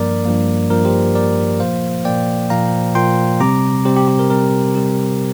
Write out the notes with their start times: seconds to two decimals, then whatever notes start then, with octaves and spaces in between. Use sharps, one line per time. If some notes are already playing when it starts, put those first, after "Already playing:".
Already playing: G2 F3 A#3 A#4 D5
0.25 G2 F3 A#3
0.70 G2 F3 A#3 A#4
0.85 G4 C5
1.15 G2 F3 A#3 A#4 D5
1.60 A#2 F3 A#3 C5 F5
2.05 A#2 F3 A#3 D5 G5
2.50 A#2 F3 A#3 F5 A#5
2.95 A#2 F3 A#3 G5 C6
3.40 C3 G3 C4 A#5 D6
3.85 C3 G3 C4 G4 C5
3.96 G4
4.08 G4
4.19 A#4
4.30 C3 G3 C4 A#4
4.75 C3 G3 C4 G4